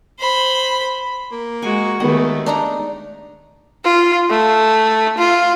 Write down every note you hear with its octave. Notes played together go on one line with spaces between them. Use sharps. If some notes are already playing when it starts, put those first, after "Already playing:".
C5 B5
A#3
G#3 F#4 G#5
D#2 D#3 G#3 A3 B3 D#5
D4 D#4 A#5
F4
A3
F4